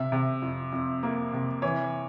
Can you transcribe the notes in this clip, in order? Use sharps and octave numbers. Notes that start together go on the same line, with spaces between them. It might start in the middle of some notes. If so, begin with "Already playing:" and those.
Already playing: C3 E5
C3
F2
F2
A#3
C3
E3 C#5